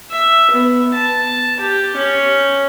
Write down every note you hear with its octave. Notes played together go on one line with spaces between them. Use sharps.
E5
B3
A5
G4
C#4